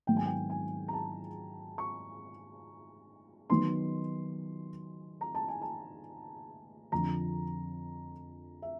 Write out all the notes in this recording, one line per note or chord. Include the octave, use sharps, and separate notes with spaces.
G#2 D#3 F#3 B3 G5
G#5
G5
G#5
A#5
A5
C#6
D#3 F#3 B3 D#4 C6
A#5
A5
G#5
A5
F2 D3 F3 A#5
E5